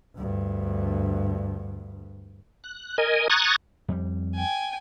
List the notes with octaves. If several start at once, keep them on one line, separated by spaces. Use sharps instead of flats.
D2 G2
F#6
A#4 D#5 G#5
A#5 C#6 D#6 F#6 G#6 A6
F2 G3
G5 G#5